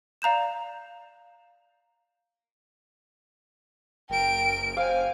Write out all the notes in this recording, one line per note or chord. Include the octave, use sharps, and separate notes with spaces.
D5 F5 A#5 G6 E7
F#1 A#4 G5 D7
C5 F5 G#5